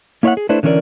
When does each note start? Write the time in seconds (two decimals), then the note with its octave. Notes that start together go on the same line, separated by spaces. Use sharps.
0.23 A#3 E4 C#5 D5 E5 F#5
0.37 G#4
0.49 A3 D4 E4 B4 C5
0.63 D3 E3 C#4 F4 A#4 D5